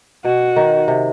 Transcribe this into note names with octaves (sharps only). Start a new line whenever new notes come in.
B2 F#4
D#3
C3